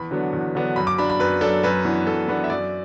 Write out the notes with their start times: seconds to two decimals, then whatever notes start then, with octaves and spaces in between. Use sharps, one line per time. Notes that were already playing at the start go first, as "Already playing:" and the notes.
Already playing: E2 B5
0.11 D3 F#3 B3 D4
0.33 E2
0.55 D3 F#3 B3 D4
0.76 F#2 B5
0.87 D6
0.98 F#3 D4 B5
1.10 B5
1.20 F#2 B4
1.41 F#3 D4 A4
1.63 F#2 B4
1.85 E3 B3 D4
2.07 F#2 A4
2.28 E3 B3 D4 B4
2.44 E5
2.50 F#2 D5